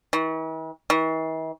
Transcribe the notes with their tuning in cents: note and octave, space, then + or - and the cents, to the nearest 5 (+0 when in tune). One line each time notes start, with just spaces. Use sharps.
E3 -45
E3 -45